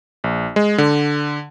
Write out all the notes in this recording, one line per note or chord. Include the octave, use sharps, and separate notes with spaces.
A#1
G#3
D3